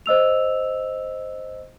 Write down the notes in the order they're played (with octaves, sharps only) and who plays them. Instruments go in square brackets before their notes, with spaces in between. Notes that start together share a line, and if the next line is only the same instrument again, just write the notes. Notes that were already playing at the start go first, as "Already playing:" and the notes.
[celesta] C5 D#5 E6 F7